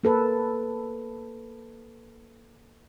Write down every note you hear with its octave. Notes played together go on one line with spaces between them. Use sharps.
A#3 A4 B4